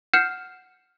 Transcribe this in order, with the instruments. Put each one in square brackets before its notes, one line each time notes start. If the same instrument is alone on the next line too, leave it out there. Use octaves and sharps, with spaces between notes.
[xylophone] F#5 F6 G6 C7 C#7 E7